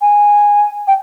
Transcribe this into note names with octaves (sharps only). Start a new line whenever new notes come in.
G#5
G5